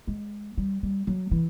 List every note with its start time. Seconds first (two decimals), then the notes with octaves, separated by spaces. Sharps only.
0.07 G#3
0.58 G3
0.83 G3
1.07 F#3
1.31 E3